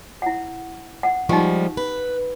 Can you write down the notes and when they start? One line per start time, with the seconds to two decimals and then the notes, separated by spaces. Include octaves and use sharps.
0.22 E4 F#5
1.03 F#5
1.29 F3 G3 G#3 D#4 G4
1.77 B4